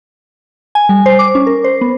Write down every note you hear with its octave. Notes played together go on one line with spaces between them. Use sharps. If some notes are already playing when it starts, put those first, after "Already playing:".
G#5
G3
C5
D6
C#4
A#4
C5
B3